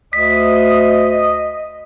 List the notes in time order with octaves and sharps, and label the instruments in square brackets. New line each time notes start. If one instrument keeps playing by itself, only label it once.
[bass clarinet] D2 [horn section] D#5 [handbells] B6